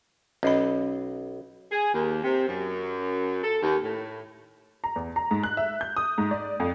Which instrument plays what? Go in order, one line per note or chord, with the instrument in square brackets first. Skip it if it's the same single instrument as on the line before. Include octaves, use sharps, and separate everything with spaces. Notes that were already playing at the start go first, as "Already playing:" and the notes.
[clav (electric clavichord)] B1 [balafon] C#4 D#5 B5
[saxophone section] G#4
D#2
C3
F#2
A4
D#2
A2
[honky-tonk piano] A#5
E2
A#5
G#2
F#6
E5
G6
D#6
G#2
D5
F2